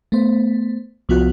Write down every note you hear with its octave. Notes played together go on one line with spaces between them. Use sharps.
A3 B3 C5
C2 F3 B3 F4 F#4 F#6